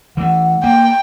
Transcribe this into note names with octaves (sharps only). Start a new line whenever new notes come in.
E3 A3 F#5
A#3 G5